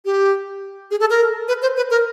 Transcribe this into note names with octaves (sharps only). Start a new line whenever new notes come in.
G4
G#4
A4
A#4
B4
C5
B4
A#4